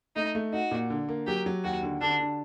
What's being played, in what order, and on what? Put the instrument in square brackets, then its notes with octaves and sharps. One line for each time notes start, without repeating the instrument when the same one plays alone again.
[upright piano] A3 [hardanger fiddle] D#4
[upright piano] A3
[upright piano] D#4 [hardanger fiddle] F#4
[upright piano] A#2
D3
A#3
[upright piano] F#3 [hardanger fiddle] G4
[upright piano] F#3
[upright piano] D#2 [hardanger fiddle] F#4
[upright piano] D3
[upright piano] D3 [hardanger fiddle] D4
[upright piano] D3